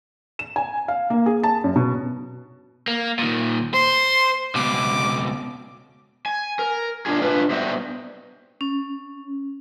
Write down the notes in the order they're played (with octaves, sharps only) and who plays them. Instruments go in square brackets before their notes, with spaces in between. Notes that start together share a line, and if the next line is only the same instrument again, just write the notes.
[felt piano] E7
G#5
F5
A#3
G#4
A5
F#2
B2
[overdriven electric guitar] A#3
A#2 D#3
[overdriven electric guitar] C5 [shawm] C6
[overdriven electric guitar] C#2 B2 [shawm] D6
[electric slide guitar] G#5
A#4
D4 F4 G#4
D4 F4 B4
G3 B3 D#4 F#4 C5 E5
[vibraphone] C#4